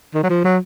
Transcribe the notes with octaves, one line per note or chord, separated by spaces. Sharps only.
D#3
F#3
F3
F#3